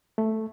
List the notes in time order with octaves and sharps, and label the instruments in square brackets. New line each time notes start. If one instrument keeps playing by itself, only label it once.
[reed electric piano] A3